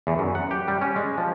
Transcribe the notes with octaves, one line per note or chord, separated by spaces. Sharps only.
E2
F#2
F#5
G4
G3
C#4
G#3
F3